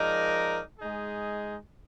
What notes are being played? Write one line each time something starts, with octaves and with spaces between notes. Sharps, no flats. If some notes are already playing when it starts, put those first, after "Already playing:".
Already playing: F3 G#3 D#4 A#4 D5
G#3 D#4 G#4